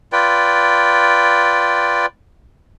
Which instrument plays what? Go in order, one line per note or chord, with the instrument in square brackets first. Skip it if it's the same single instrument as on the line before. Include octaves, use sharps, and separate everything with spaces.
[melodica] F4 B4 D5 G5